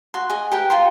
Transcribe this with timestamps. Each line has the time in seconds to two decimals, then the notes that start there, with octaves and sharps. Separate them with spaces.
0.14 F#4 C6
0.30 G#4 D#5
0.52 G4 A#4 B4 G5
0.70 F4 G5 A#5 C6